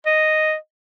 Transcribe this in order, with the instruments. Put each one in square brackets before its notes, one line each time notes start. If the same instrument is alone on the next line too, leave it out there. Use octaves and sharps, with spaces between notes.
[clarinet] D#5